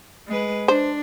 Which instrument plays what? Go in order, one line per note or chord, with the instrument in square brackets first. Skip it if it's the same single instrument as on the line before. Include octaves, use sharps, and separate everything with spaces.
[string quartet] G#3 B4
[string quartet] D4 [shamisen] C5